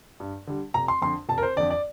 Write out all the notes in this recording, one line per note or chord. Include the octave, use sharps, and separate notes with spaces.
G2
D3 G3
F1 A#5
C6
F2 D3 C6
F1 A5
A#4
C5
F2 D3 D5
D5